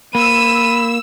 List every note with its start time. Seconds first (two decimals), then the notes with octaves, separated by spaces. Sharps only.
0.15 A#3 B5 E6 D#7